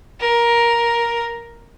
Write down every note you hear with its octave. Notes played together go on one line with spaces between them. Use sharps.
A#4